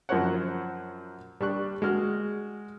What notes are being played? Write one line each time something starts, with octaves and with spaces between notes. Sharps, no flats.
F#2 F3 A#4 C5 C#5 F#5
G3 D4 C#6 F#6
G#3 F#4 F6